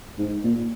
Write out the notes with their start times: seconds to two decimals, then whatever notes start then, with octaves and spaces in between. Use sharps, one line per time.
0.19 G#2
0.44 A#2